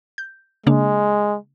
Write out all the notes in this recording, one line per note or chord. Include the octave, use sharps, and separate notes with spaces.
G6
C#3 G#3 A#3 D4